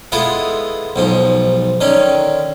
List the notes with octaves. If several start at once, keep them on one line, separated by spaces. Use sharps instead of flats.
G#3 B3 E4 F4 A4
B1 G#2 F3
D3 D#3 C#4